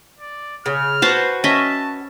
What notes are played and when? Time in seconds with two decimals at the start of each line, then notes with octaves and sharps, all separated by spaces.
0.19 D5
0.66 C#3 F6
1.02 F#4 B4 C5 A5
1.44 C#4 D#5 E5 A5